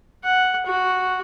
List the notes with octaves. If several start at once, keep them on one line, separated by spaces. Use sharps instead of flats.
F#5
F#4